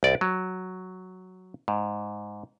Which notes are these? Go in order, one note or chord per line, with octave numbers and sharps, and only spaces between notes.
C2 D5
F#3
G#2